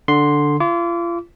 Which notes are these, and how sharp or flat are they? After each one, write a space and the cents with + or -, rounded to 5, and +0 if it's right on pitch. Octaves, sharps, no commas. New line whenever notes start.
D3 +0 C6 +0
F4 -35 D6 -35